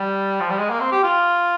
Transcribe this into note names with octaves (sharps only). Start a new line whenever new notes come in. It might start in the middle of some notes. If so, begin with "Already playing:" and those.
Already playing: G3
F3
G3
G#3
A#3
C4
G4
F4